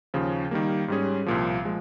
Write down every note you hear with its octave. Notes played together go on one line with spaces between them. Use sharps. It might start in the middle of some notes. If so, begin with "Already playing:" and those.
D#2 C#3 F3
D#3 G3 A#3
G#2 G3 C#4 G#4
C2 A#2 F3
F3 G#3